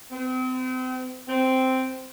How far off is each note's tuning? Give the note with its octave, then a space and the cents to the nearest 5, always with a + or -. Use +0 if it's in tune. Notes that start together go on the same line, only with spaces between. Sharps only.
C4 -35
C4 -5